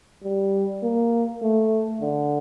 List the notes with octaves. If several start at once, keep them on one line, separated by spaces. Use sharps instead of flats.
G3
A#3
A3
D3